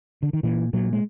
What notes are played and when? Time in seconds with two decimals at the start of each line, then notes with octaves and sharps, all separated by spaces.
0.23 D3
0.33 D#3
0.43 A#2 E3
0.73 A#2 F#3
0.93 G#3